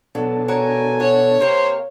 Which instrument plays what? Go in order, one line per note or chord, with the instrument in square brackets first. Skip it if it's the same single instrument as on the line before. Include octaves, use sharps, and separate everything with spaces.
[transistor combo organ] B2 D4 A4 [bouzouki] F#3
[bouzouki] F#4 A#4 C#5 [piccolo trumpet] G#5
[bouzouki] F#4 [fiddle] C#5
[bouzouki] C3 A#3 [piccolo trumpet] C5